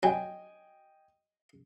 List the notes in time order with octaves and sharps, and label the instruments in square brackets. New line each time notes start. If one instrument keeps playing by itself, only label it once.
[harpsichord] F#3 [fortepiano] D#5 G5 G#5